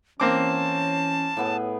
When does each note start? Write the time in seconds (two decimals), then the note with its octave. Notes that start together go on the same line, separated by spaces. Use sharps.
0.20 E3 A#3 C4 C#4 A5 D6
1.37 A2 B3 G#4